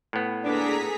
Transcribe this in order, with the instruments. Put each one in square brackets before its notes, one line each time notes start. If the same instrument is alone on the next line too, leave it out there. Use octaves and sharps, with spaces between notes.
[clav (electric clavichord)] A2 B3
[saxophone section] D2 D4 [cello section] A#3 A4 B4 [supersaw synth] G#4 A#5 B6